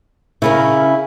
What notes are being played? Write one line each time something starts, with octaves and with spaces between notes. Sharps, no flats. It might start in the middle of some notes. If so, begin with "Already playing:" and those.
C#3 C#4 E4 A#4